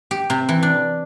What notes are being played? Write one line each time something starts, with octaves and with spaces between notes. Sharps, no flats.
G4
C3
E3
D4